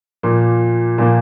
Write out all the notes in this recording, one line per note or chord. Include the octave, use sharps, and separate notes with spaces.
A#2 F3 A#3
A#2 F3 A#3